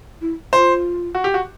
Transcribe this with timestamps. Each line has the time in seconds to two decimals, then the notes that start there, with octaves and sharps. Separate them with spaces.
0.21 E4
0.53 F4 C5
1.15 F#4
1.24 G4
1.34 F#4